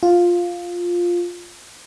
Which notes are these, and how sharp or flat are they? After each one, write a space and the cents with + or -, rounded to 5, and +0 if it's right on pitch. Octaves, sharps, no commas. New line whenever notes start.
F4 +5